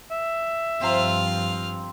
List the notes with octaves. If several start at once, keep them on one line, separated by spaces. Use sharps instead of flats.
E5
G2 F3 C4 F4 F5 A#5